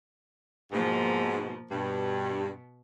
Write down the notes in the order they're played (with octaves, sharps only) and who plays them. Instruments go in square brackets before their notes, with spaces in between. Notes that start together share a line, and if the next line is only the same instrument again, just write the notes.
[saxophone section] G#2 B2 [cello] F3 A#3
[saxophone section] G2 [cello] B2